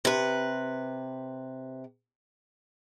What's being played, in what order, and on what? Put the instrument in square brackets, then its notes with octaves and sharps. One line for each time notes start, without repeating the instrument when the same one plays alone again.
[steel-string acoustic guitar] C3 B4